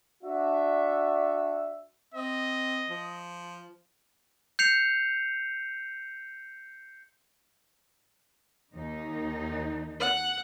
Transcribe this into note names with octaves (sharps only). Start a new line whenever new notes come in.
D4 F#4 E5
C4 D#5
F3
G6 C7 C#7 F7
D#2 D#3 D#4
F#5